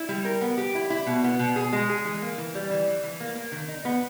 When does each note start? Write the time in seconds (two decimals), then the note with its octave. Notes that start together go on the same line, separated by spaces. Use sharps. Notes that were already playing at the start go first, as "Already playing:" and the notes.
Already playing: E4
0.09 G3
0.25 A#4
0.41 B3
0.57 G4
0.75 E4
0.90 E4
1.07 B2
1.24 B3
1.39 B2
1.56 G#4
1.73 G#3
1.89 G#4
2.05 E3
2.22 A#3
2.38 E3
2.55 G3
2.70 E3
2.87 E3
3.04 E3
3.20 A#3
3.36 A#3
3.52 D#3
3.68 D#4
3.85 B3